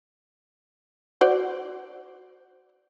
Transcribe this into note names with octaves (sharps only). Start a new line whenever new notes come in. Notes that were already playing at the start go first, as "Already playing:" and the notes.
F#4 C5 D5